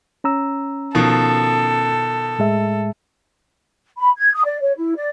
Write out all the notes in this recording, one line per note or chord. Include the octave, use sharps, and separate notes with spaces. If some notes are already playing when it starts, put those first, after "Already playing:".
C#4 A#5 E6
B2 D#3 F3 A4
A2 G#3 E5
B5
G#6
D#6
D5
C#5
E4
D5